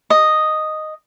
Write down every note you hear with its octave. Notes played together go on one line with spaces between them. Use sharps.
D#5